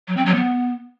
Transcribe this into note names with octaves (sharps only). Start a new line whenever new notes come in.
F#3
C4
F#3
B3